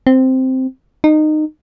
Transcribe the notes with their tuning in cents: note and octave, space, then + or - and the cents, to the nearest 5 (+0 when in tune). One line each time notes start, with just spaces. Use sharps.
C4 -5
D#4 -20